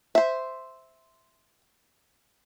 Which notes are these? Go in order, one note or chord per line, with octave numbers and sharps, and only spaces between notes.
C5 E5